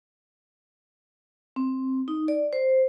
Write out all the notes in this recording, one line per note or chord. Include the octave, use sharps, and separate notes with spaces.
C4
D#4
D5
C5